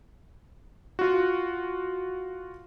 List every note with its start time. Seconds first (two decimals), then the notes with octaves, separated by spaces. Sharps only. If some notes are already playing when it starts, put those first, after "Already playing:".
0.99 F4 F#4